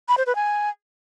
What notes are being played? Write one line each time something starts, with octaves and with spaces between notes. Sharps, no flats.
B5
C5
B4
G#5